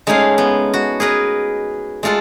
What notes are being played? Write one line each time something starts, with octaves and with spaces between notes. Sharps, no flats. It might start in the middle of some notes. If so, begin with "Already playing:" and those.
G#3 A3 C#4 D#4 G#4 F5
B3
F#4
G#4 A#4 B4 D#5
G#3 A3 F4 A4 F#5